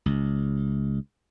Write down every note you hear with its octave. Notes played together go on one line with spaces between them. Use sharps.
C#2